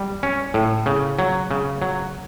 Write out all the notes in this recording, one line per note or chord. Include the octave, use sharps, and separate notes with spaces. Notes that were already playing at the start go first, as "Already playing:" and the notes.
Already playing: G3
C#4
A2
C#3
F#3
C#3
F#3